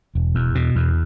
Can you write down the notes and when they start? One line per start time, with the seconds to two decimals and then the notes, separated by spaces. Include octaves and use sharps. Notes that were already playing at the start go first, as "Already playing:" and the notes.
0.15 E1
0.35 E2
0.55 B2
0.76 E2